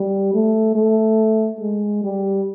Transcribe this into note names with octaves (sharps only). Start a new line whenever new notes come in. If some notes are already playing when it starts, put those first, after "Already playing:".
Already playing: G3
A3
A3
G#3
G3